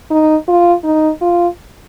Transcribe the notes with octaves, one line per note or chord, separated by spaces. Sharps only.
D#4
F4
D#4
F4